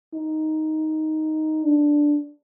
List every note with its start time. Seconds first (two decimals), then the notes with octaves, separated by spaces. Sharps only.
0.14 D#4
1.64 D4